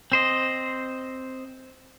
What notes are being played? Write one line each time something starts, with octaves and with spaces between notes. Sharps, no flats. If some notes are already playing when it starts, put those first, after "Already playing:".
C4 C5 D#5